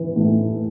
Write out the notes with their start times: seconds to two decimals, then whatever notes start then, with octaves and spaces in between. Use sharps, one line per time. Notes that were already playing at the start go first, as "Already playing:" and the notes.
Already playing: E3
0.16 A2